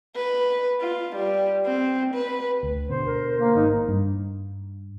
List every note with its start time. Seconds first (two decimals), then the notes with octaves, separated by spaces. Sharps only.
0.16 B4
0.81 F4
1.16 G3
1.66 C4
2.14 B4
2.63 D2
2.89 B2 D3 B3 C5
3.06 A#4
3.39 A#3
3.55 G#1 D#4
3.89 G2